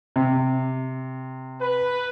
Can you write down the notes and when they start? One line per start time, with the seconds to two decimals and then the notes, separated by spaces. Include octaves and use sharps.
0.16 C3
1.61 B4